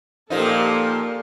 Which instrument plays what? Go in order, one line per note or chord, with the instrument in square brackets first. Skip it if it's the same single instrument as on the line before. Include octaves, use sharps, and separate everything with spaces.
[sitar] A#2 F3 D#4 [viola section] A#3 G4 A4